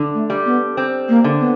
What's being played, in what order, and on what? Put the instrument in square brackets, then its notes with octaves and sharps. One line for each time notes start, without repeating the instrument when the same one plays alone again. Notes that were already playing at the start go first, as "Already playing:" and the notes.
Already playing: [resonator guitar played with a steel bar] D3
[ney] A3
[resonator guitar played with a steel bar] G3
[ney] B3
[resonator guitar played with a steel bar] C4
[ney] A#3
[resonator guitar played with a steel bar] D3
[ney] B3